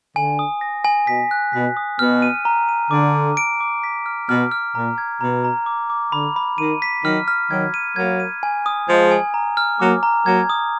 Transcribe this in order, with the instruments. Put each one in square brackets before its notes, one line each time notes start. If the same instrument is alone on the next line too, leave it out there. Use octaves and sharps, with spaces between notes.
[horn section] D3 [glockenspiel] G#5
[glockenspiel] D#6
A#6
G#5
[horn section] B2 [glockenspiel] B6
[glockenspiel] F#6
[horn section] B2 [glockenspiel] B6
[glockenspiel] D#6
[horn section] B2 [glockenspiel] F6
[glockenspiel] D#7
A#5
D#7
[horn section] D3 [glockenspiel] D6
[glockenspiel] D6
D7
D6
B6
F6
[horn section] B2 [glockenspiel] F6
[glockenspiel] F6
[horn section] A#2 [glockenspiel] A#5
[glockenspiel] G#6
[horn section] B2 [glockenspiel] A#5
[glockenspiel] A#5
D6
D6
[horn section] D3 [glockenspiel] B5
[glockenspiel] B5
[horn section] D#3 [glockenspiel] D#7
[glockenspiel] B6
[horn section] D#3 F#3 [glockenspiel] F6
[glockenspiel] F6
[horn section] D#3 F#3 [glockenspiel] G#6
[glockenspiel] D#7
[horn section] F#3 A#3 [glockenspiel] G#6
[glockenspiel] D#7
G#5
D#6
[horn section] F3 G#3 [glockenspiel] G#6
[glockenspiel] G#5
A#5
F6
[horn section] F#3 A#3 [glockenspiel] D6
[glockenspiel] A#5
[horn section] F#3 A#3 [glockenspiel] G#6
[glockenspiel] D#6